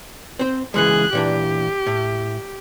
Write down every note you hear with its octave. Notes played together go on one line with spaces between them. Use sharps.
C4 C5
C#3 E3 G#3 G#4 F#6
A#2 E3 D4 G4
A2